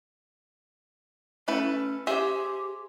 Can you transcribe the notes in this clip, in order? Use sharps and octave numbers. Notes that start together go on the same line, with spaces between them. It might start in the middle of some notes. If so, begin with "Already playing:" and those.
A3 C#4 E4 B4
G4 G#4 C5 E5